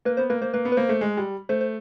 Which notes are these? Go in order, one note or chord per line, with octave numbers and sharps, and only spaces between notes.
A#3 B4
B3 C5
A#3 B4
A#3 C5
A#3 B4
B3
B4
A#3 C5
A3
G#3
G3
A3 C5
C5